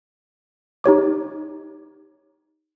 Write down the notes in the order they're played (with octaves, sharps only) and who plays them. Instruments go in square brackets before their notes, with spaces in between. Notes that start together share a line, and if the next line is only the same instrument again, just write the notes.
[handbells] D#4 G4 C#5 D6